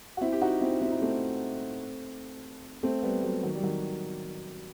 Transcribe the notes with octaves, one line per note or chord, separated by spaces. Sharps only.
F#4
C4 E4
G4
D#4 F#4
C4 E4
C4 E4
D#4
A3 C4
A3 C4
G3 B3
F#3 A3
D#3 F#3
G3
D#3 F#3